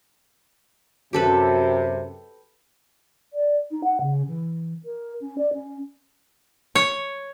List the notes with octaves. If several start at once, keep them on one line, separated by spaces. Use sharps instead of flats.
F#2 C3 G4 A4 B4
D5
D#4
F#5
C#3
E3
A#4
C#4
D5
C#4
C#5